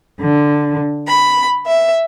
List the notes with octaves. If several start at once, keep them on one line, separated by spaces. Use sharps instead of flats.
D3
B5
E5